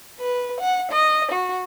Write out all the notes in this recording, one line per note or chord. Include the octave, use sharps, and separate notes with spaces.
B4
F#5
D#5
F#4